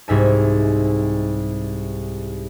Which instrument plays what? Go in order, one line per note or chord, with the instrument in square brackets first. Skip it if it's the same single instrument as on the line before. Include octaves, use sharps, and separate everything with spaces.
[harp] C2 G#2 E5 G#5